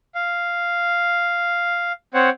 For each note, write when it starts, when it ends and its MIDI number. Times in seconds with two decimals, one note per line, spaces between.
0.15 1.92 77
2.14 2.30 60
2.14 2.30 72
2.14 2.30 73
2.14 2.30 78